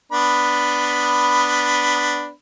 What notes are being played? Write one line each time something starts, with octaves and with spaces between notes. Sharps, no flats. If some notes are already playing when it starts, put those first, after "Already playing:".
B3 D4 B5